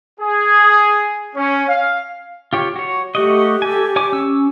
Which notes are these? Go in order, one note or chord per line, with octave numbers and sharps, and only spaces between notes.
G#4
C#4
F5
F4 G4 C#5
F#4 C#5
A3 F#4 G4 D#5
A4 G#5
C#5 G#5 D6
C#4 E6